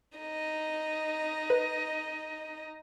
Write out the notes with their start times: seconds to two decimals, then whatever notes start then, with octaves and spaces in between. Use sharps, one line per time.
0.18 D#4 D#5
1.50 B4